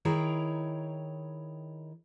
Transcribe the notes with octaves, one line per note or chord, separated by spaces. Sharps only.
D#3 E4 G#4 C#5 G5 A#5